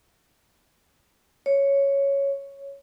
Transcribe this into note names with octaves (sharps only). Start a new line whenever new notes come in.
C#5